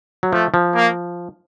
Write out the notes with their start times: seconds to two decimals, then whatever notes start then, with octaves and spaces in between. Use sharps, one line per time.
0.23 F#3
0.32 F3 A3
0.54 F3
0.74 A#3